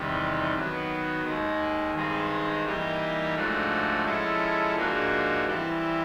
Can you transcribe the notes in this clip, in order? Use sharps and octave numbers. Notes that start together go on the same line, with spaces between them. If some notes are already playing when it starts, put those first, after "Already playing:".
Already playing: E2 C3 D#3 G3
D#3 F#3 B3
D#2 D#3 G#3
G2 D#3 G#3 C4 D#4
E3 G3 A#3 D#4 G4
G#2 F3 A3 D4 F#4
F3 G#3 C#4 E4 A4
G#2 F3 A#3 D4 F#4
E3 G3 C4 E4